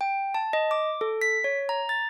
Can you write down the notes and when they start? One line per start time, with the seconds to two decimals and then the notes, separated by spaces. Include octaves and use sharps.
0.01 G5
0.34 A5
0.53 D#5
0.71 D6
1.01 A4
1.21 B6
1.44 C#5
1.69 A#5
1.89 A6